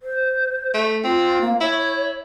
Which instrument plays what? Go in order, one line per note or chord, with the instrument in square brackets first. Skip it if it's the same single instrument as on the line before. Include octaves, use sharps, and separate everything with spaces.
[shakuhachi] C5
[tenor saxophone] A3
[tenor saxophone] C4 [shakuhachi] F4
[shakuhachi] A#3
[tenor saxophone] E4 [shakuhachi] C#5